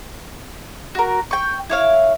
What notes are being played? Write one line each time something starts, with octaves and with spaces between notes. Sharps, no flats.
F#4 A#4
G5 C#6
E4 C#5 F5